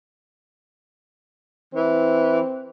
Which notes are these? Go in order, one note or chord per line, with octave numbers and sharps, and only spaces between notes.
E3 C4